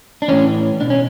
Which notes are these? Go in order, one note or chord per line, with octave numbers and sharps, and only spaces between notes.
D4
A2 E3 C#4
B2 D4
C#4